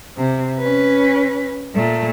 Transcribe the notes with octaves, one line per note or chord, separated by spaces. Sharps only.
C3
C#4 B4
A#2 A3